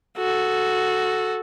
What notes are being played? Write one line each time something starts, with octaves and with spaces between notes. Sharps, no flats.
F#4 A4